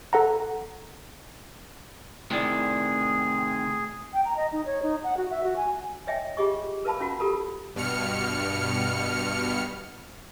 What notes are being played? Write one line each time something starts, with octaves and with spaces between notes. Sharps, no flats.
A4 F#5 A#5
A2 C3 D#3 G#4 D5
G5
A#5
D#5
D#4
C#5
D#4
F#5
F#4
E5
F#4
G#5
C#5 D#5 E5 G5 G#5
F4 G4 G#4 D#5 C#6
A#4 B4 F5 A5 B5
C#4 F4 F#4 F#5 A#5
F4 G4 A4 A#4 A#5 B5
G2 B2 F6 C#7